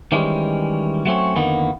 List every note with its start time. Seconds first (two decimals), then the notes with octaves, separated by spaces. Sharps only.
0.12 D#3 E3 G3 G#3 C#4
1.06 F#3 A3 C4 C#4
1.36 F2 D3 D#3 A#3 B3